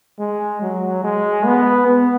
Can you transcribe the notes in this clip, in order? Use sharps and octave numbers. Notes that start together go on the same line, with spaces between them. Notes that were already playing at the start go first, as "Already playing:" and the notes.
G#3
F#3
G#3
B3
B3